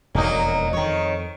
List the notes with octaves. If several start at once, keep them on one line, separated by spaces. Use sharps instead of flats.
E1 F2 F#3 A#3 D#4
F2 D#3 C#5